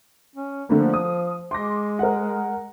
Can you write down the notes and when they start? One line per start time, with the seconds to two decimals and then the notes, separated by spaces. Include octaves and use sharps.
0.36 C#4
0.69 D3 F3 A3 A#3
0.94 D#6
1.51 G#3 C6 D6 A#6
1.99 A#4 F#5